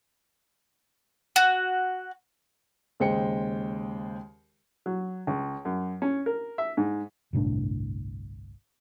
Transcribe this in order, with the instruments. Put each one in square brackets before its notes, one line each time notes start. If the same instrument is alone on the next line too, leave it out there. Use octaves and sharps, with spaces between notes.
[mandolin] F#4
[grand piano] D#2 C#3 G#3 C5 G5 C#7
[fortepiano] F#3
C#2
F#2
C#4
A#4
E5
G#2
[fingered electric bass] G1 C2 A2 D4